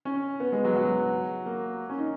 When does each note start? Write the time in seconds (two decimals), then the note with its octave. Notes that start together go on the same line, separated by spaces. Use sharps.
0.05 C#4
0.40 B3
0.52 G#3
0.64 F#3
0.76 F#3
1.46 A#3
1.90 C#4
1.98 D#4